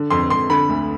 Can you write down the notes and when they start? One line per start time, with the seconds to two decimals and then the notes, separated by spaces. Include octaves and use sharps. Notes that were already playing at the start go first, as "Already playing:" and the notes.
Already playing: D3
0.10 F2 C6
0.30 F2 C6
0.50 D3 B5
0.69 D2